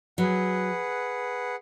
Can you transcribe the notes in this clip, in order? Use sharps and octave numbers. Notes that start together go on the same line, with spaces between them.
F#3 G#4 B4 F#5